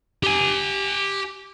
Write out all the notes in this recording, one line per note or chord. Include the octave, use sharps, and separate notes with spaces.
G4 G#5